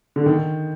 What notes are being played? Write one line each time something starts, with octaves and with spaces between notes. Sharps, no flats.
D3
D#3